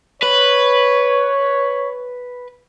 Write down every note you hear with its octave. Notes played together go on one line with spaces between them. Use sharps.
B4 C#5